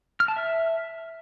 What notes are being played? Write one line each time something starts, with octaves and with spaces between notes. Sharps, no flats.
F6
A5
E5